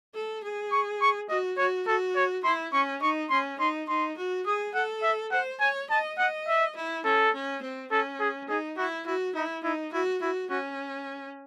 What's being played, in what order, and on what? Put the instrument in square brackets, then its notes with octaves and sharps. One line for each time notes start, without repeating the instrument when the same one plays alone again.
[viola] A4
G#4
[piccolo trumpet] C#6
C#6
[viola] F#4 [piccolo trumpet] D#5
[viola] F#4 [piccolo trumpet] C#5
[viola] F#4 [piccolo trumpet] A4
[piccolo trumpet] C#5
[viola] E4 [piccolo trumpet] C6
[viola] C#4 [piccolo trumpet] C#6
[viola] D#4 [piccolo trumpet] C#6
[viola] C#4 [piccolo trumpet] C6
[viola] D#4 [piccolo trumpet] C6
[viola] D#4 [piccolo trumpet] C6
[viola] F#4
[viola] G#4 [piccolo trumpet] D#6
[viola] A4 [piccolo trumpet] F#5
[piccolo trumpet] E5
[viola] C5 [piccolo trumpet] F#5
[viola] C#5 [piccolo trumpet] G#5
[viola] D#5 [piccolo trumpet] A5
[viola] D#5 [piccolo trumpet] F#5
[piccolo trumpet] E5
[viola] E4
[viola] C#4 [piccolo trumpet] A4
[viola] C#4
C4
[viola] C#4 [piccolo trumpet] A4
[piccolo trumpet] G#4
[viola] D#4 [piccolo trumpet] G#4
[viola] E4 [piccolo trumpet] F#4
[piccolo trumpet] E4 [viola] F#4
[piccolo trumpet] D#4 [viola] E4
[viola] D#4 [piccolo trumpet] E4
[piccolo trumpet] E4 [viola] F#4
[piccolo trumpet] E4 [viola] F#4
[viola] C#4 [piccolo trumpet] F#4